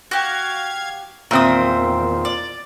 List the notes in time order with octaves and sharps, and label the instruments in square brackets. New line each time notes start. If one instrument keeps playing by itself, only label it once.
[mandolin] F#4 G4 [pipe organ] F5 G#6
[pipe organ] E2 D#3 [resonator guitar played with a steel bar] A#2 C4 [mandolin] E4 D#6
[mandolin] D5